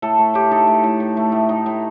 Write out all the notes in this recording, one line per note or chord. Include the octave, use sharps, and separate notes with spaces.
A2 A4
A3
A2 G4
D#4 A4
A2
A2
A2
A3
A2
D#4
A2